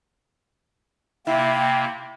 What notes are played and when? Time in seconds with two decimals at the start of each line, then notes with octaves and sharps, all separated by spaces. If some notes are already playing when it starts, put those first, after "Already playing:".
1.27 C3 A#3 E4 G5